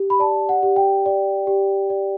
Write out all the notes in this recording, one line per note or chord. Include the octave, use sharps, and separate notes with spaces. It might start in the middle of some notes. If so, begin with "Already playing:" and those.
Already playing: G4
B5
D5 A5
F#5
G4
G5
D5
G4
D5